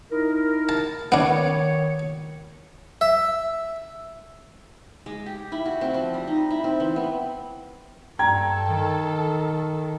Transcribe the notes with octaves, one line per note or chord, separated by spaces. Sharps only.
D#4 E4 A#4
A5
D#3 B3 D4 C#5
E5
G#3
G4
E4
F#4
C4
F3
G3
D#4
E4
C4
E3
B3
G2 A4 G5 A#5 G#6
D#3